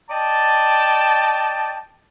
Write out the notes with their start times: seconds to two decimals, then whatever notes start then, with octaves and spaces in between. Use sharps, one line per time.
0.10 D5 D#5 G5 A5